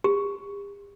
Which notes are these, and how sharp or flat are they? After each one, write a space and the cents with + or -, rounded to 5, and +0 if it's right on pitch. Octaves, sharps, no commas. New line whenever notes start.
G4 +45